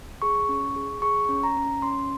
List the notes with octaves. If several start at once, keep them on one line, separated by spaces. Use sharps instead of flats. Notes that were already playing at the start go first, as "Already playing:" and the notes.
G#4 C#6
C#4
G#4
G#4 C#6
C#4
A#5
C#4
C#4 C6